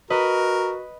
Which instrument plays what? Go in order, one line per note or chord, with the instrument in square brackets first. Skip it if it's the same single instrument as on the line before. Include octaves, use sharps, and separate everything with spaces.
[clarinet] F#4 [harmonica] A#4 [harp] B4 D#5